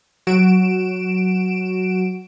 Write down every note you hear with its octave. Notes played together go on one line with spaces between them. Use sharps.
F#3 F#4 D7 E7